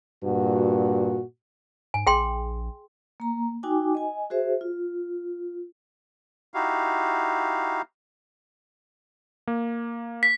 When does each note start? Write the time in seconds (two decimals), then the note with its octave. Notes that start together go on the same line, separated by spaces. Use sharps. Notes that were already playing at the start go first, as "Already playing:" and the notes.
0.24 G2 A#2 F#4
1.94 G#2 G#5
2.07 A#1 G#4 G5 C6
3.20 A#3 A#5
3.63 D#4 F#4 G5 G#5 D6
3.95 D#5 G#5
4.30 F#4 G#4 C5 E5
4.61 F4
6.54 D#4 E4 F#4 G4 F5
9.47 A#3
10.23 B6